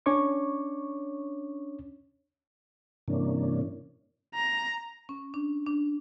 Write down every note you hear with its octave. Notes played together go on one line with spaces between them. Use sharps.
C#4 D4 C#5 C#6 D6
G2 C3 E3 A#3 C#4 D4
A#5
C#4
D4
D4